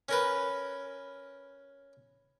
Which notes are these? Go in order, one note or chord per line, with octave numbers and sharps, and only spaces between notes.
C#4 A#4 B4